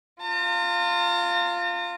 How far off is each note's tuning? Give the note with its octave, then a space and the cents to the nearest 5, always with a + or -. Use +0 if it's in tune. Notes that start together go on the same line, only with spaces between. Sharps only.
F4 +0 A#5 -45